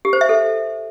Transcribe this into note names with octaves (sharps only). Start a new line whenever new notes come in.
G4
C5
E5
A4